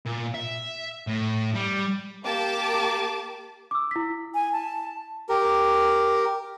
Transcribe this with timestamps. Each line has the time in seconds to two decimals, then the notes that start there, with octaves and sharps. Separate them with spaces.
0.05 A#2
0.34 E5
1.07 A2
1.54 G3
2.23 A#3 G4 A5 D6
3.71 D6 E6
3.91 E4 B6
4.34 G#5
4.53 A5
5.29 G4 A#4